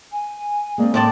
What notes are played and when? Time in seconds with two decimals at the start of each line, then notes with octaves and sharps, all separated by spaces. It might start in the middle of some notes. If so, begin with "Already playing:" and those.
0.11 G#5
0.78 G#3 A#3 C4 D5
0.94 A2 D5 A5 C6